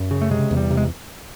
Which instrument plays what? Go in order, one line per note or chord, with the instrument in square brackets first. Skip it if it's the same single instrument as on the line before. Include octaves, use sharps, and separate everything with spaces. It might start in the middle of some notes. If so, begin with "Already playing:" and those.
Already playing: [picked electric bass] F#2
C#3
A3
C3 G#3
E2
G3
C3
G#3